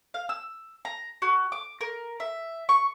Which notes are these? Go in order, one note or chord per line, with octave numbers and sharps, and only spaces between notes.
F5
E6
A#5
F#4
D6
A#4
E5
C#6